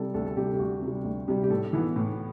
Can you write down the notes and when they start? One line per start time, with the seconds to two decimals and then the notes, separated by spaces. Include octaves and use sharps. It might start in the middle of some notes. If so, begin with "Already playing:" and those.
Already playing: C3 G3 A4
0.14 D2 A4
0.26 A4
0.37 C3 G3 G4
0.54 G4
0.59 D2 F#4
0.82 C3
0.87 G3
1.05 D2
1.28 C3 G3
1.43 G4
1.50 A2 A4
1.73 E3 B3
1.96 A2